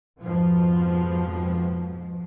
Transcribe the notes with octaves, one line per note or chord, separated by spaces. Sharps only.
F2 G#2 B2 F3